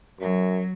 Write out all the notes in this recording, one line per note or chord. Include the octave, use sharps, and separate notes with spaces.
F#2 F#3